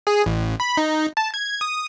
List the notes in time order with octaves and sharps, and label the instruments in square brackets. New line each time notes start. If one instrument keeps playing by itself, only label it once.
[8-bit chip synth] G#4
A1
B5
D#4
A5
G#6
D#6